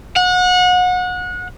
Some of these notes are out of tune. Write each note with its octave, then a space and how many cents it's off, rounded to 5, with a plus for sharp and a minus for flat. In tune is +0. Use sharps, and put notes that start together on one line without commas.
F#5 -30